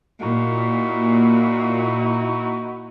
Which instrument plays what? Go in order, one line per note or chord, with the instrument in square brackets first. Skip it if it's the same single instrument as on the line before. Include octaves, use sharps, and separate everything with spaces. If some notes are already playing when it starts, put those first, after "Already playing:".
[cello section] A#2 [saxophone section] D#4 E4 F#4